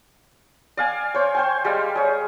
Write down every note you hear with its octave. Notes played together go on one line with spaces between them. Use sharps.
D5 F5 G#5
C5 C#5
C5 G5 G#5
G3 G#3 F5
G#4 C#5